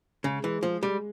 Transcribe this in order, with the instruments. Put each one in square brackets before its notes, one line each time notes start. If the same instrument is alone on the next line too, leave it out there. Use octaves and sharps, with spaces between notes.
[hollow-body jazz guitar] C#3 [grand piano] G#3
[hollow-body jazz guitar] E3 [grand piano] G#3
[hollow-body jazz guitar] F3 [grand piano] G#3
[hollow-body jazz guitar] G3 [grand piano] G#3